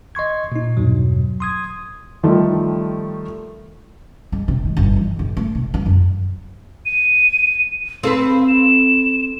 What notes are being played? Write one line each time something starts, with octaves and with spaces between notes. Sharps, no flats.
D#5 C6 C#6 G#6
A#2 D#4
E2 G2 B2 F#3
C6 D#6 G#6
D#3 F3 G3 A3
G#3
C3
D#3
G1
E3
G#1
A3
C3
B3
F#2
D#7
C4 A4 B4 F5
E7